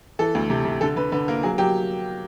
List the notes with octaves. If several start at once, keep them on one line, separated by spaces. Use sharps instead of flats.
E3 A4
D2
C3
C3
D3 A4
D3 B4
D3 B4
A#3 A#4
F#3 G#4
F#3 G4